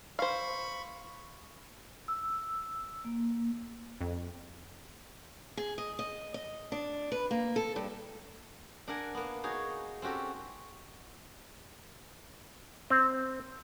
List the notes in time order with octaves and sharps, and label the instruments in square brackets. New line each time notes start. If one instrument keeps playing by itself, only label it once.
[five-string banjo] C5 F5 [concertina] B5 C#6
[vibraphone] E6
A#3
[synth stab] F2
[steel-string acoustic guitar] G#4
D#5
D#5
D#5
D4
B4
A#3
A4
G2
[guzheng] D4 A#4 F#5 G#5
A#3 B3
D#4 F#4 G#4 C#5
C4 C#4 F#4 G4 A4
[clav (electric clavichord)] C4